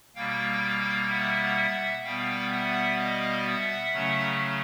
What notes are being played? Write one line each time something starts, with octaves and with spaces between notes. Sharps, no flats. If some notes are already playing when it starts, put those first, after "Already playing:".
B2 G3 A#3 F5 G5
E5 F#5
B2 G3 B3 F5 G5
E5 F#5
D#5 F5
E5 F#5
C#3 F#3 A3 C#4